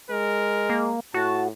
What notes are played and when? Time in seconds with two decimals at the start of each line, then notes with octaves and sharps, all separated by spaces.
0.11 G#3 A#4
0.70 A#3
1.14 A2 F#4 A5